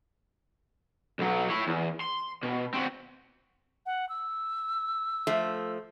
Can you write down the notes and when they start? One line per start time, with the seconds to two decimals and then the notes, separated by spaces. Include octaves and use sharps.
1.19 B1 F#3
1.50 E4 C#5
1.67 E2
2.01 C6
2.43 B2
2.74 C4 F#4
3.86 F#5
4.09 E6
5.27 F3 A3